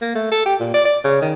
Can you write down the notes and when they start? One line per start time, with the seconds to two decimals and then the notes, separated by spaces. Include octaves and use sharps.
0.02 A#3
0.15 A3
0.31 A4
0.46 G4
0.60 A#2
0.74 D5
0.85 D5
1.04 C#3
1.22 D#3